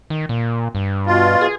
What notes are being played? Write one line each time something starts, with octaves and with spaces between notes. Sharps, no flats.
D#3
A#2
G2
B2 F4
G#4